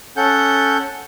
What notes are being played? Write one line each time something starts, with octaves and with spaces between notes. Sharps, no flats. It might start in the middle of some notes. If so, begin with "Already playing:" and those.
C#4 A4 F#5 G6